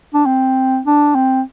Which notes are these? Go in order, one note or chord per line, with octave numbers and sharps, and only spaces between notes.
D4
C4
D4
C4